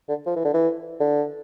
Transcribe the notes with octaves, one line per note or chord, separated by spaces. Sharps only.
D3
F3
E3
D3
E3
D3